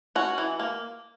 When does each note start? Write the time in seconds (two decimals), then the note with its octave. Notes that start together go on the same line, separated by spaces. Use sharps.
0.15 C#4 F#4
0.38 E3
0.59 A#3